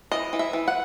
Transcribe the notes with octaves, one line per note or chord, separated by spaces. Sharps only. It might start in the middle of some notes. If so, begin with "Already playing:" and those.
E3 D#5
E3
E5
E3
F#5